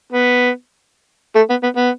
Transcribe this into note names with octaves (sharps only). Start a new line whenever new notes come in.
B3
A3
B3
B3
B3